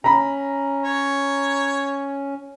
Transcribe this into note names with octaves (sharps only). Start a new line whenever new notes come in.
C#4 A#5 B5
C#5